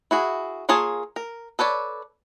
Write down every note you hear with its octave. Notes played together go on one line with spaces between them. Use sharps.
E4 F#4 G#4
A#3 F4 G#4 C#5 A5
A#4
A4 B4 C#5 D5